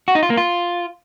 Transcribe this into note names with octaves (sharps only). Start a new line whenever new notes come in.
F#4
D#4
F4
A#3
F4